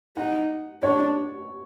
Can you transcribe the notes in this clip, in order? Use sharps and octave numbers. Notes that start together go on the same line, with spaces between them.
D#4 F#5
D4 C#5